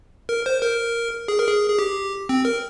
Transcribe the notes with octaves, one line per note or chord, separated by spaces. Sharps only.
A#4
C5
A#4
G#4
A#4
G#4
G#4
G4
C4
A#4